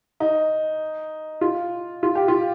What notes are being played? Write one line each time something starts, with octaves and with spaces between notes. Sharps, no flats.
D#4
F4
F4
G4
F4